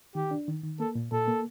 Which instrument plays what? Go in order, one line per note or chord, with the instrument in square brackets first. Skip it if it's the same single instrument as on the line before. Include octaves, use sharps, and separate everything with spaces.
[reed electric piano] D#3 [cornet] G4
[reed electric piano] D4
D#3
D#3
[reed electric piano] A#3 [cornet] A4
[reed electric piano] A#2
[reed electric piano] A#2 [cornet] A4
[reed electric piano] A#3